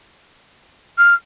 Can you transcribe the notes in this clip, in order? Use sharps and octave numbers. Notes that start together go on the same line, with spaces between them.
F6